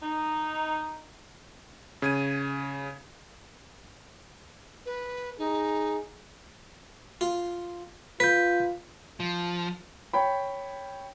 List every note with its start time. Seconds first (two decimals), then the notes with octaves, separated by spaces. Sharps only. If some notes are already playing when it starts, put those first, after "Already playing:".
0.02 D#4
2.02 C#3 G#6 D#7
4.86 B4
5.38 D#4 G#4
7.21 F4
8.20 F4 B4 G6 B6
9.20 F3
10.13 C#5 G5 B5